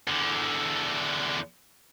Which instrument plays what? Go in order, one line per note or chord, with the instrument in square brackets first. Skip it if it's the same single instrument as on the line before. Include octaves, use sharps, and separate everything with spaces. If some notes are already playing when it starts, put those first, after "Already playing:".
[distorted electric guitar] E2 D3